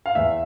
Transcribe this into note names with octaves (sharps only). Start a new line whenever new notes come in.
F5
E2 E5